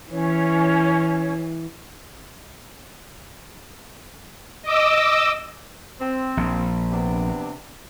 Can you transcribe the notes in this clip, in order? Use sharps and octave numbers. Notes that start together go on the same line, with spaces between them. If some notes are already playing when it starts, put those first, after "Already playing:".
E3 C#4 C#5
D#5 D6 E6
C4
A#1
C3 B3 D4